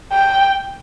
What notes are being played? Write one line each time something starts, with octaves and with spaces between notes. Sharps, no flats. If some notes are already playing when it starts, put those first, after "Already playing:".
G5